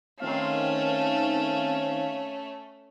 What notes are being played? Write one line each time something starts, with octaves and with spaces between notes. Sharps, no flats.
D#3 A3 C4 C#4 F5